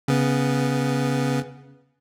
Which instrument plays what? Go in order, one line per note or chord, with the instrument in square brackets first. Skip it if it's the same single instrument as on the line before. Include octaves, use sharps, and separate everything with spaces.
[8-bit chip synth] C#3 B3